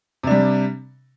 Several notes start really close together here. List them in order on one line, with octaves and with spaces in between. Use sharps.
C3 D4 G3